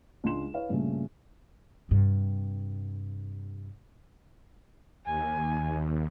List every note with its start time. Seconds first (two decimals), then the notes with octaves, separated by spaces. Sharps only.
0.24 C#2 D4 C6 E7
0.53 E4 B4 C#5 F5
0.69 G2 A#2 C#3 A3
1.89 G2 C3
5.06 D#2 G#5